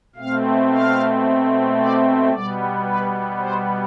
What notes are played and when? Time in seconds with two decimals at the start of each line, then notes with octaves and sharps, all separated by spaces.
0.16 B2 A3 C4 F5
0.70 F5
1.77 D5
2.30 B2 G3 B3 D5
2.84 B4
3.37 C5